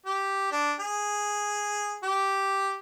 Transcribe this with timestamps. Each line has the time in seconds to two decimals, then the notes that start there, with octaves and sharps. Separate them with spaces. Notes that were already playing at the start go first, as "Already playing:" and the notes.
0.06 G4
0.52 D4
0.80 G#4
2.03 G4